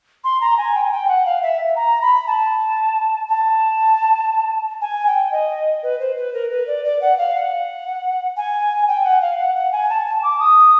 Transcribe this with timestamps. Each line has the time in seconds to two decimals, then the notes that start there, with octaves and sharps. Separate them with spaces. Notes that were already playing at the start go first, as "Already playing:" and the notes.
0.24 C6
0.41 A#5
0.57 G#5
0.75 G5
0.84 G#5
0.92 G5
1.08 F#5
1.26 F5
1.42 E5
1.76 A#5
2.02 B5
2.27 A5
3.29 A5
4.81 G#5
5.07 G5
5.31 D#5
5.83 B4
6.00 C5
6.17 B4
6.34 A#4
6.50 B4
6.67 D5
6.85 D5
7.01 F#5
7.18 F5
7.36 F#5
8.37 G#5
8.88 G5
9.04 F#5
9.22 F5
9.38 F#5
9.55 F#5
9.72 G#5
9.90 A5
10.06 A5
10.23 D6
10.40 D#6